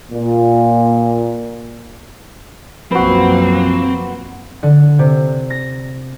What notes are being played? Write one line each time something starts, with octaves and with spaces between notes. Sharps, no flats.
A#2
B1 F#2 F3 A#3 C4 F#4 B4
D3
C3
A#6